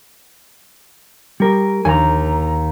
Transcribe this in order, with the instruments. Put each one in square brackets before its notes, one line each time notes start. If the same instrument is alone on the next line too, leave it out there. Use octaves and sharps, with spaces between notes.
[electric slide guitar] G3 A#4
[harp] D#2 [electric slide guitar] G#5 A#5